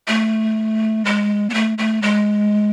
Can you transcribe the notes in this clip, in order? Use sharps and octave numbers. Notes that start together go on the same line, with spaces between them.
A3
G#3
B3
A3
A3
G#3